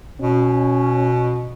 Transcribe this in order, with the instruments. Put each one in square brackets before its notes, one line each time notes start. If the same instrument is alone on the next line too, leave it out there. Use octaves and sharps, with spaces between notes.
[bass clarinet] B2 [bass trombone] C#4